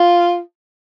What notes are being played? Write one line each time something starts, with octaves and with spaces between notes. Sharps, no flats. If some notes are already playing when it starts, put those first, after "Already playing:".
Already playing: F4